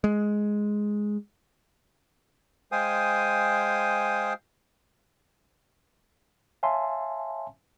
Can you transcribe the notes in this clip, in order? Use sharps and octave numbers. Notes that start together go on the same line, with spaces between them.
G#3
G#3 C5 F5 G5 G#5 D#6
C#5 E5 F5 G#5 A5 C6